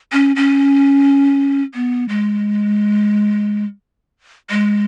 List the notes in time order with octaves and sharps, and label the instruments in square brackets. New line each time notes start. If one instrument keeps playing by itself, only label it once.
[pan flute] C#4
C#4
B3
G#3
G#3